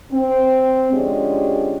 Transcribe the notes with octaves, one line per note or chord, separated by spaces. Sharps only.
C4
D3 F3 G#3 C#4 G4 D5